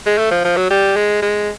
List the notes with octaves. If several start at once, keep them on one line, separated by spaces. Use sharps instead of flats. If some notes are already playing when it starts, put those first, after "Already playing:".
G#3
A3
F3
F3
F#3
G3
G#3
G#3